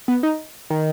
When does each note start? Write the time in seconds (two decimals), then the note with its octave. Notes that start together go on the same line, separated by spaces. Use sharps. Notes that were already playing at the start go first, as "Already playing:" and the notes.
0.08 B3
0.23 D#4
0.70 D#3